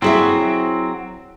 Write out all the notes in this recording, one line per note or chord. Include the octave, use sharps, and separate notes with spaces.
F#3 C4 E4 G#4 E5